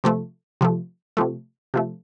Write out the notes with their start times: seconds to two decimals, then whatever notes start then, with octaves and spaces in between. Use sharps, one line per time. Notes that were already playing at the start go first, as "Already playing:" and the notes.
0.04 C3 F3 A3
0.61 C3 F3 A3
1.17 C3 F3 A3
1.74 C3 F3 A3